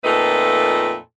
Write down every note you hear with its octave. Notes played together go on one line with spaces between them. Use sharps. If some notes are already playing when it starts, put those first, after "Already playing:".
F2 A#2 A3 D#4 A4 B4